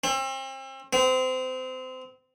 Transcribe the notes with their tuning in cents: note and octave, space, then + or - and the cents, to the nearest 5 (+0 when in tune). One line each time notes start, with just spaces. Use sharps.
C4 +40
C4 -25